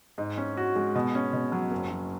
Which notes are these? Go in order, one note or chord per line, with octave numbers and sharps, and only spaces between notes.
G#2
C#4
F#4
G#3
B2
C#4
B2
F#3
F#1
F#3